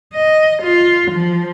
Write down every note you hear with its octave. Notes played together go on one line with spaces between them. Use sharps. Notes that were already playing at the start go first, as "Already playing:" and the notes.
D#5
F4
F3